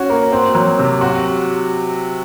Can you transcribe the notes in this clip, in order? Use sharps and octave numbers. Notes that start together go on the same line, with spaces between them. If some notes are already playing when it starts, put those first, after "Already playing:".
Already playing: C#4 F#4
A#3
C4
F#3
C3
F#4